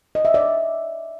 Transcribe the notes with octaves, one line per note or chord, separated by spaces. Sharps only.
D#5
E5
D5